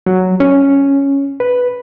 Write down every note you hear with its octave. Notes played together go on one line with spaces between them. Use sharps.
F#3
C#4
B4